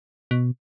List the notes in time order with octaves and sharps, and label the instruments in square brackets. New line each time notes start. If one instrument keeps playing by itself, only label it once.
[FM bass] B2